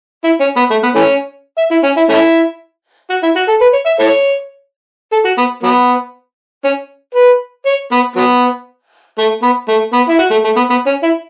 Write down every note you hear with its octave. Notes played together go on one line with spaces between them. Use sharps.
E4
C#4
B3
A3
B3
E3 A3 C#4
E5
E4
C#4
E4
A3 C#4 E4
F#4
E4
F#4
A4
B4
C#5
E5
E4 A4 C#5
A4
F#4
B3
F#3 B3
C#4
B4
C#5
B3
F#3 B3
A3
B3
A3
B3
E4
F#4
A3
A3
B3
B3
C#4
E4